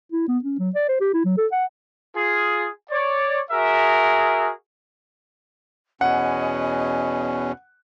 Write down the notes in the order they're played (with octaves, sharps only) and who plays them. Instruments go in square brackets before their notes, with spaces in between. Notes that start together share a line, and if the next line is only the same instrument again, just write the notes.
[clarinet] E4
B3
C#4
F#3
D5
C5
G4
E4
F#3
A4
F#5
[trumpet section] F4 G#4
C#5 D5
F#4 G#4 A#4 E5
[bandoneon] E2 B2 C#4 [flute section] D#5 G#5 B5 [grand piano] F#5